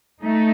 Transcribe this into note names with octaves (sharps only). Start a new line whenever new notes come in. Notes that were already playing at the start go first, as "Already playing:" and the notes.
A3 D#4